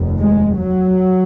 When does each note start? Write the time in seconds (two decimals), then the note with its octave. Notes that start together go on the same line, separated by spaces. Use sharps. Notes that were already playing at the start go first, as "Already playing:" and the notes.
Already playing: F1 D#2
0.19 G#3
0.57 F#3